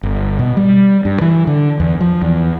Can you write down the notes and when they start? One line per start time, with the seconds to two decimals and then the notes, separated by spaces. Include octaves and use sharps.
0.03 G1
0.39 B2
0.57 G3
1.05 G2
1.21 E3
1.47 D3
1.80 E2
2.01 F3
2.22 E2